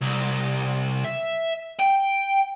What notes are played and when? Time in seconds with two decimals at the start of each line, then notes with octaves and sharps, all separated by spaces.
0.02 C2
1.04 E5
1.80 G5